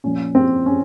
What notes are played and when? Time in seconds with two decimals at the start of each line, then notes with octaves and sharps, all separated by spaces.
0.04 A#2 F3 C#4
0.35 C4
0.66 C#4